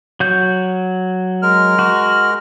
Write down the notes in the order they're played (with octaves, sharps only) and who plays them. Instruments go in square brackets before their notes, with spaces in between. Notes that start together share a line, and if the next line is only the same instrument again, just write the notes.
[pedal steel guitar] F#3 F#4 G6
[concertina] G#3 A#4 F6
[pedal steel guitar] F#4